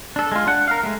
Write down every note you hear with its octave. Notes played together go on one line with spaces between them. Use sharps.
D4 A4
G#3 F4
D4 F#5
A#4 F5
G#3 A3